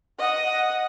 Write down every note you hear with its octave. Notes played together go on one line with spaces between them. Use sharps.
D#5 F#5